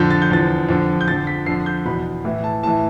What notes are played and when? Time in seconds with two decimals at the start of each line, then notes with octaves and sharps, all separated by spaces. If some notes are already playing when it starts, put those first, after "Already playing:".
Already playing: F2 D3 F3 G6
0.11 A6
0.22 G6
0.31 E2 D3 F3 A6
0.69 F2 D3 F3
1.01 G6
1.08 F2 D3 F3 A6
1.27 B6
1.46 F2 D3 F3 C7
1.66 G6
1.85 E2 B2 B5
2.24 A2 E3
2.44 A5
2.63 A2 E3 A5